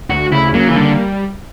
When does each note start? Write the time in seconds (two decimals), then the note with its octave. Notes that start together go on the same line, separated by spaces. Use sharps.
0.09 D2 F#4
0.32 C#3 E4
0.54 F#3 A#3
0.68 E3
0.76 D3 G3